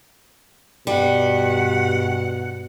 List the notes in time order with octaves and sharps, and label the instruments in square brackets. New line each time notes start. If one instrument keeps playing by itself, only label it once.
[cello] G2 F#5 [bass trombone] B2 [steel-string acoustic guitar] G3